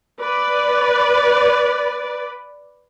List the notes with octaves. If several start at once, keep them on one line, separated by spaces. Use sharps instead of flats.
B4 D5